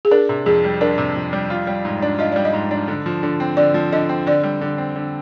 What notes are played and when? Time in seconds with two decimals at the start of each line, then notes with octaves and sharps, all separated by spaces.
0.05 G#4
0.11 D4 A#4
0.29 C3
0.46 F2 G#4
0.64 G3
0.81 D4 A#4
0.98 C3
1.16 F2
1.33 G3
1.50 F4
1.67 G3
1.85 G#2
2.02 D4
2.19 F4 D#5
2.32 G3 D5
2.45 D#5
2.53 G#2
2.71 D4
2.88 D3
3.06 F3
3.23 D3
3.40 C4
3.57 D3 D5
3.74 F3
3.92 D3 D#5
4.09 C4
4.26 D3 D5
4.43 G3
4.61 D3
4.78 C4
4.96 D3